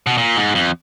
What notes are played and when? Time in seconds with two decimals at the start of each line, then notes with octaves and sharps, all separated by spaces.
0.07 B2
0.18 A#2
0.37 G#2
0.55 F2